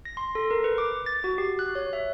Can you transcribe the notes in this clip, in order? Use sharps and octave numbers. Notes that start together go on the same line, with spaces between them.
A#6
C6
A4
A#4
B4
D6
A6
F#4
G4
F#6
C#5
E5